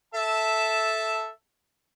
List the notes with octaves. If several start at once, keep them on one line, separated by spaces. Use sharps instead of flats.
A4 E5 A5